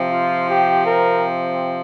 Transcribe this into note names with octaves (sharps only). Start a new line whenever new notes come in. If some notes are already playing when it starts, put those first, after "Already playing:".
Already playing: C3 F3 C4
F4
G4
A#4